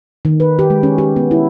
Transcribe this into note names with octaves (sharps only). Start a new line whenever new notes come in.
D#3
B4
G4
G#3
C#4
G4
B3
E4